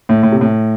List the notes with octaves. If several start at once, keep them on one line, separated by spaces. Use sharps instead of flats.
A2
A2
C3
A2